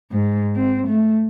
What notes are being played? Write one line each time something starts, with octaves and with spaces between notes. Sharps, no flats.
G#2
C4
A3